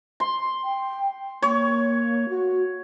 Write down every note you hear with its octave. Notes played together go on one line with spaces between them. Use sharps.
C6
G5
A#3 C#5
F#4